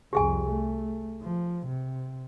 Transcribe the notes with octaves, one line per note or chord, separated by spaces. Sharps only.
C2 F2 G4 G#4 G#5
A3
F3
C3